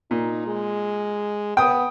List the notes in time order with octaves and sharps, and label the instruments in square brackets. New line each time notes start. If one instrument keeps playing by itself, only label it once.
[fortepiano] A#2 [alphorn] D#4
[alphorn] G#3
[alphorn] B3 [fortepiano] G5 D#6